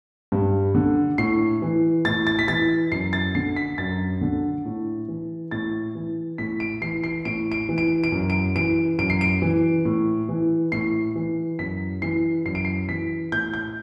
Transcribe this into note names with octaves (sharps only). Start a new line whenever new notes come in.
G2
D3
A2 C7
E3
A2 A6
A6
B6
E3 A6
F#2 C7
A6
D3 C7
B6
F#2 A6
D3
A2
E3
A2 A6
E3
A2 B6
D7
E3 C7
C7
A2 D7
D7
E3
D7
D7
F#2
D7
E3 D7
F#2 D7
C7
D7
E3
A2
E3
A2 C7
E3
F#2 B6
E3 C7
F#2 C7
D7
C7
E3 B6
A2 G6
G6